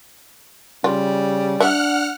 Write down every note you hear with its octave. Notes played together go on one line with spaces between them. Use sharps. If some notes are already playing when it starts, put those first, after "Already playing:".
C#3 G3 F4
D4 E5 F#5 F6 F#6